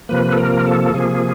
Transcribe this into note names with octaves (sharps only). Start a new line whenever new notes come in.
C3 F3 A#3 B4
A4
A#4
A4
C3 F3 A#3 G#4